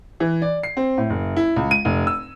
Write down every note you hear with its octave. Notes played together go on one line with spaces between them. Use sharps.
E3
D5
C7
C4
A2
F#1
E4
C#2
D#7
F1
E6